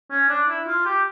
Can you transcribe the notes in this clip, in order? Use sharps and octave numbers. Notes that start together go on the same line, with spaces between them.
C#4
D4
E4
F4
G4